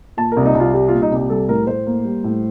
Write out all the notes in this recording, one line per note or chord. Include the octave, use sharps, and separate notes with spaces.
A#2 A5
A#4
C2
D#4
C2
F4
G3 G4
A#2 F4
D#4
C2 G4
G3 A4
A2 A#4
A2 C5
A#3
G3
A2